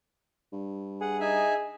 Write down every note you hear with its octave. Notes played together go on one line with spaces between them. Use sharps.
G2
G#4 F#5
D#4 E5 G#5